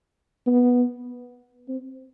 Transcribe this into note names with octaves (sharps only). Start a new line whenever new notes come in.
B3
C4